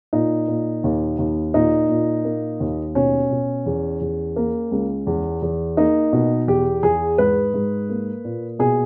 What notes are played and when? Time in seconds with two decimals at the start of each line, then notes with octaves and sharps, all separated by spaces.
0.13 A#2 D#4
0.48 A#2
0.84 D#2
1.18 D#2
1.54 A#2 D#4
1.89 A#2
2.25 A#3
2.60 D#2
2.95 B2 C#4
3.31 B2
3.66 E2
4.01 E2
4.36 A#3
4.72 C#2
5.07 E2
5.42 E2
5.77 A#3 D#4
6.13 B2
6.47 E2 G4
6.83 E2 G#4
7.18 G#2 B4
7.54 G#2
7.89 A#3
8.25 A#2
8.59 B2 G#4